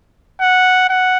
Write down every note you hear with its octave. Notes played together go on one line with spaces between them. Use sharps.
F#5
F#5